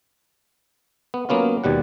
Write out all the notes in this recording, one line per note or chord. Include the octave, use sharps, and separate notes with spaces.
B3
F#3 A#3 B3 C#4 F4
D#2 B2 G3 F#5